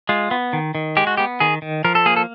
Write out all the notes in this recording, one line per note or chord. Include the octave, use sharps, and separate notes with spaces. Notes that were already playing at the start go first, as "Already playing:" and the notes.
G#3 F4
B3
D#3
D#3
G#3 G4
F#4
B3 G4
D#3 G#4
D#3
F3 A#4
A4
A#3 G#4
A4